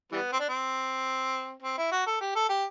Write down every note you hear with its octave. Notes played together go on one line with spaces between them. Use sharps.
E3 G3 B3
C4
D4
C4
C4
E4
F#4
A4
G4
A4
G4